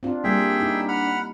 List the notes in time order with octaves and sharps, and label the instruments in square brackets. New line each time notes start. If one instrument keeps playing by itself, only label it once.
[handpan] C4 F4 [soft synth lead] D4
[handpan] G3 A#3 [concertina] G#4 E5 G5
[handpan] D#4 E4
[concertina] F#5 B5 F6